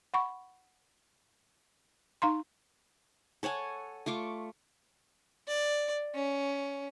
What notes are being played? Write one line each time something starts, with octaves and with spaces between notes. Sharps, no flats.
F#5 B5 C#6
D#4 F5 A#5 C6
A4 C#5 F#5 G#5
A3 F4 C#6 D6
D5
C#4